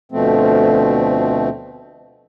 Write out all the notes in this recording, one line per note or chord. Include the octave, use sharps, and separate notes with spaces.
D2 B2 F3 A3 C4